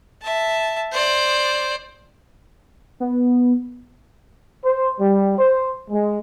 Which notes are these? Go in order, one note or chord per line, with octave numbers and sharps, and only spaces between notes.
E5 A5
C5 D5
B3
C5
G3
C5
G#3